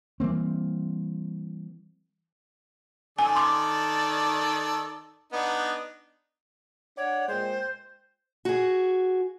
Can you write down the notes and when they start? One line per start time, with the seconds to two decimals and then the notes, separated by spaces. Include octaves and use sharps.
0.20 E3 G3 A#3 C4
3.19 D#3 A4 D5 G#5
3.35 C6 D6
5.33 B3 D4 D#4
6.97 D4 C#5 D5 F#5
7.28 A#2 G#3 C5 G5
8.45 F#4 G#4